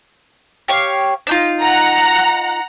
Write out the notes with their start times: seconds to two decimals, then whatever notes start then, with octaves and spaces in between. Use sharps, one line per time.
0.68 G4 C#5 F5
1.27 D4 D#4 F4
1.61 F#5 A#5